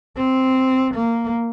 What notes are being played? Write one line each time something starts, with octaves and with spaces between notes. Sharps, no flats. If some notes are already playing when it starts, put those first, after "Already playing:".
C4
A#3